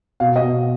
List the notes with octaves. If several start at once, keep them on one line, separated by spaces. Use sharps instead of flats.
B2 F5
D#5
B2